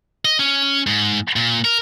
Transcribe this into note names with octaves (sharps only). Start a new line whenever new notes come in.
D#5
C#4
G#2
A#2
A#4